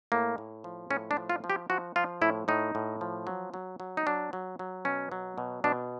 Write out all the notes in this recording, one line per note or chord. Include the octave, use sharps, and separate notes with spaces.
A2 A#3
A2
F3
A2 C#4
D4
F3
F4
F3
G4
F3 F#4
F3 F4
A2 E4
A2 D#4
A2
F3
F#3
F#3
F#3
D#4
F#3 D4
F#3
F#3
B2 C#4
F#3
B2
B2 D4